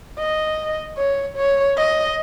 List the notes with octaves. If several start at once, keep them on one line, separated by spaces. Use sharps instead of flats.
D#5
C#5
C#5
D#5